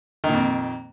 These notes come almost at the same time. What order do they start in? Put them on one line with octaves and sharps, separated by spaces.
D#3 A#2 F2